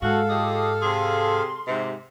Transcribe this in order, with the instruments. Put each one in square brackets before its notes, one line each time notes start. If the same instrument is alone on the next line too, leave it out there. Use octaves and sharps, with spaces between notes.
[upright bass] G#2 [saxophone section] F#4 [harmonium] A4 F5 [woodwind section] G#5 A5
[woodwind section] F4 D6 [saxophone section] G4 G#4 D#5
[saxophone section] C3 G#4 [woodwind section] C6
[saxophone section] G#2 C3